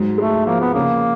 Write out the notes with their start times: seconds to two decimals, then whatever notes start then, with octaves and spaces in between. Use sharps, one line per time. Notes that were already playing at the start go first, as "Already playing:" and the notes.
Already playing: G#2 F#3
0.18 G#3 A3
0.47 F3 A#3
0.60 B3
0.74 C#3 A#3